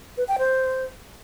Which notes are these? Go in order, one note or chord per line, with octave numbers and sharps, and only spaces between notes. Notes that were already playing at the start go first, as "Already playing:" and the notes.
B4
G5
C5